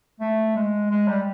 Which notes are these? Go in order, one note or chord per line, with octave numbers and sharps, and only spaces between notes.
A3
G#3
G#3
G3